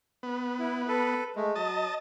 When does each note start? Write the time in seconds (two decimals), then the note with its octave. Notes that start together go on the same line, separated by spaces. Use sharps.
0.23 B3
0.59 E4
0.88 A4 B4
1.36 G#3 A3
1.56 F#3 D#5 A5